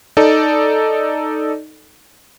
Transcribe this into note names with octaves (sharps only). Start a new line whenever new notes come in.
D#4 A4 D5